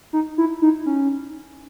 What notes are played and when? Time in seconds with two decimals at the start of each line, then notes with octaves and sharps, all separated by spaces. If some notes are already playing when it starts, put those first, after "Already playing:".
0.13 D#4
0.38 E4
0.62 D#4
0.86 C#4